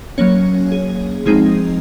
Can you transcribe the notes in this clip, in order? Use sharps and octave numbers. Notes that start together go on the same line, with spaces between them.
F#3 A#3 C#4 C#5
G#4
F3 G#3 C4 D#4 G#4